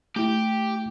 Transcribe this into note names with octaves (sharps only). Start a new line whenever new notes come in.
A3 E4 G4